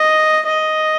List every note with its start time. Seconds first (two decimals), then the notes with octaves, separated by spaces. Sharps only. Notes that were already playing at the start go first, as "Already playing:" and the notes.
Already playing: D#5
0.46 D#5